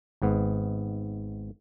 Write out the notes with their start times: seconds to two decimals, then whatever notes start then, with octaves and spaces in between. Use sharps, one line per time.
0.22 G#1 G#2 B3